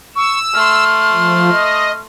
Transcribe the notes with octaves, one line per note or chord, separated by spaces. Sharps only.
C#6 E6
A3 C6 F6
F3
D#5